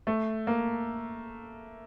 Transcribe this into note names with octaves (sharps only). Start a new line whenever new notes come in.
A3
A#3